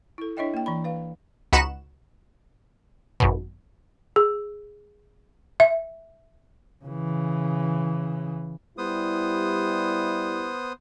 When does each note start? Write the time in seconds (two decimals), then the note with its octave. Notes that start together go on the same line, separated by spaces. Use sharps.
0.18 E4 A4
0.37 D4 E4 C#5 D#5 E5 G5
0.54 A#3 G5
0.66 E3 A#5 B5
0.84 B4 F5
1.53 C#2 D#4 F#4 B4 F#6 E7
3.20 G#1 F#2 B2
4.16 G#4
5.60 E5
6.85 C#3 E3
8.78 G3 B3 E4 C5 D#6